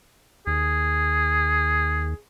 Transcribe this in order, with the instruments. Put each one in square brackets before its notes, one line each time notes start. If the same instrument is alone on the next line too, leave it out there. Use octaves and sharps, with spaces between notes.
[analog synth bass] D#2 [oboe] G#4